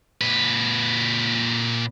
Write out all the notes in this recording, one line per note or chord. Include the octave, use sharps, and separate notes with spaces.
A#2 B4